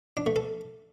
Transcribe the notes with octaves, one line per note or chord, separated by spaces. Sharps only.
D4
A3
A4